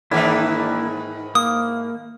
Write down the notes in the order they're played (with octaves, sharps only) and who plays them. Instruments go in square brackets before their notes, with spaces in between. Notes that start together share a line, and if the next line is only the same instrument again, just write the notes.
[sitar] G#2 D#3 E3 [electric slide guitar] A#3 D4 E4
[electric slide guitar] A#3 [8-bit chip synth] D#6